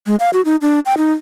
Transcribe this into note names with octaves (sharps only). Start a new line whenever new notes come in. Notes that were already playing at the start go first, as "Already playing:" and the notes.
G#3
F5
F#4
D#4
D4
G5
D#4